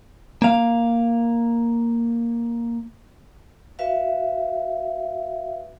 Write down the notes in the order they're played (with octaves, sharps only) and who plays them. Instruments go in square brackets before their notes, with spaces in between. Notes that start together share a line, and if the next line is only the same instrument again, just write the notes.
[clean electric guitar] A#3 F5
[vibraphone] F#4 B4 E5 F5